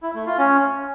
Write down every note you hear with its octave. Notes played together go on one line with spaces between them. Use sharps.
E4
A3
F4
C#4